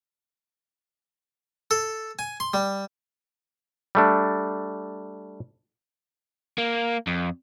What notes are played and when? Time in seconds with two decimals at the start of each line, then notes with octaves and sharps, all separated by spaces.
1.71 A4
2.19 G#5
2.40 C6
2.54 G3
3.95 G3 A3 D4
6.58 A#3
7.07 F2